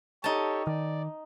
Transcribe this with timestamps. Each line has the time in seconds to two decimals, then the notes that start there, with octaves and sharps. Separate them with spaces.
0.24 D#4 G4 A4 C#5 A5
0.67 D#3 D5